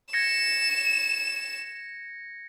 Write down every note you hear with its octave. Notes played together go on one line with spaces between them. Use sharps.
G#6 A#6 C#7 E7